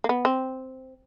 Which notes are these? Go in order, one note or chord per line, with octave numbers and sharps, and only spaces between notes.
A#3
B3
C4